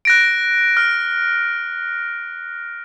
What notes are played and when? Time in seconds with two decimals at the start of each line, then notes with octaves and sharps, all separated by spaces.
0.05 F#6 A#6 D7
0.77 F6